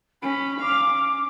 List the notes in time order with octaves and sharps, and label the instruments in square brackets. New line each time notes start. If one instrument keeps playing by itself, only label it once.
[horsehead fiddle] C#4 [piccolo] B5
[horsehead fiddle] F5 [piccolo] D6
[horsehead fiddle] C#4